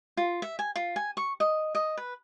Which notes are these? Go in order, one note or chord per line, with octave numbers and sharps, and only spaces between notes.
F4
E5
G#5
F4
G#5
C#6
D#5
D#5
B4